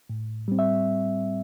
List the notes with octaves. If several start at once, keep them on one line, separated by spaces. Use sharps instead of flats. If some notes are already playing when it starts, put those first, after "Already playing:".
A2
G3 C4
E5